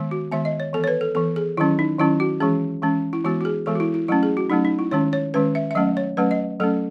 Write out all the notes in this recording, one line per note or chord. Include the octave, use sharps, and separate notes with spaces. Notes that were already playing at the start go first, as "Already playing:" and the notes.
Already playing: D#3 G#3 B3
F#4
D#3 G#3 B3 E5
D#5
C#5
E3 B3 A4
C#5
B4
A4
E3 B3 A4
G#4
D#3 F#3 C#4 E4
D#4
D#3 F#3 C#4 E4
F#4
E3 G#3 C#4 G#4
E3 G#3 C#4
E4
E3 G#3 B3 F#4
F#4
G#4
E3 G#3 B3 A4
F#4
E4
E4
F#3 A3 C#4 E4
G#4
F#4
F#3 A3 C#4 D#4
D#4
E4
D#3 G#3 C#4 C#5
C#5
D#3 G#3 C#4 B4
E5
E5
F#3 A3 C#4 D#5
C#5
F#3 A3 C#4 B4
D#5
F#3 A3 C#4 A4